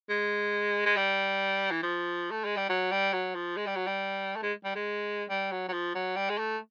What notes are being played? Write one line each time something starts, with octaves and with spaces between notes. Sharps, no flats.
G#3
G#3
G3
E3
F3
A3
G#3
G3
F#3
G3
F#3
F3
G#3
G3
F#3
G3
A3
G#3
G3
G#3
G3
F#3
F#3
F3
F#3
G3
G#3
A3